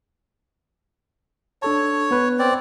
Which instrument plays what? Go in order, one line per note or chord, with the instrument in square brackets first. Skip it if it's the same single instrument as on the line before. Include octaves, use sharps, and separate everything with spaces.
[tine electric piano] D4 A4 A5 [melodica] C#5
[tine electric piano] B3 B4
[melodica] C4 D5